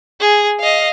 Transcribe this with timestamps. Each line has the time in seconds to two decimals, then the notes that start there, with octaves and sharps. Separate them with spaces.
0.20 G#4
0.60 D#5 F5